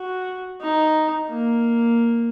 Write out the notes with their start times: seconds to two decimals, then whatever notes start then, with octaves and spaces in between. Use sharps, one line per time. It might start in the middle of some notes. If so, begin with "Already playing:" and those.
Already playing: F#4
0.61 D#4
1.30 A#3